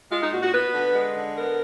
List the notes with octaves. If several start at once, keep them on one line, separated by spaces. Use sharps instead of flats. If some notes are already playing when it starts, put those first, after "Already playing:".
G#3 F4
D#4
A#2 F#4
F#4
B3 B4
D3
G#3
D3
B3 A#4